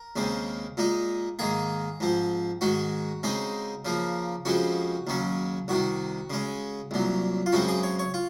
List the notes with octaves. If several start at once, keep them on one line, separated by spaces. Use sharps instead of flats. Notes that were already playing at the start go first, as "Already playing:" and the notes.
Already playing: A#4
D#2 C#3 G#3 C4
A#2 G#3 D#4
G#2 D#3 A#3 G#4
G#2 F3 C4
G#2 D#3 G#3 F#4
C#3 G#3 C4 D#4
C#3 F3 A#3
F2 C#3 G#3 C4 F#4
D#2 C#3 F#3 C#4
C2 C3 D#3 F#4
C#3 G#3 C#4
C2 A#2 F#3
F4
F#2 C#3 G#3 C4 F#4
G#4
C#5
C#5
F4